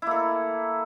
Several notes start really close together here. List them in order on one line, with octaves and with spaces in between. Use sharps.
E4 A#3 A4